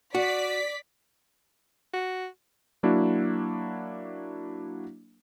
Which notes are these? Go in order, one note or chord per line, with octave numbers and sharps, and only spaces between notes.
F#4 D5 B6
F#4
F#3 A#3 D4 E4 F#4